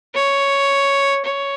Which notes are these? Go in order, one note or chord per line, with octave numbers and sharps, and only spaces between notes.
C#5
C#5